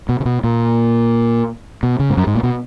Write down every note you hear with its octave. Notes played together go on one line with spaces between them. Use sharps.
B2
C#3
B2
A#2
B2
C#3
G#2
F#2
G#2
A#2
B2